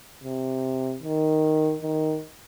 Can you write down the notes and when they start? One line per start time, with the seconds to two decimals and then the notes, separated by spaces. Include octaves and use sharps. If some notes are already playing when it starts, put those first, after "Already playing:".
0.24 C3
1.02 D#3
1.82 D#3